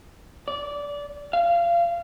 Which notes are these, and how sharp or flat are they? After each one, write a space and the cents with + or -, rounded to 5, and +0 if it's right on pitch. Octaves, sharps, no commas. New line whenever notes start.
D5 -20
F5 -25